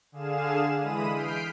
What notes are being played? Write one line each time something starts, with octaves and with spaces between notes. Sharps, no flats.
D3 G#4 F5 E7
E3 G#3 B5 D#6 D#7
F6 G6 B6 C7 D7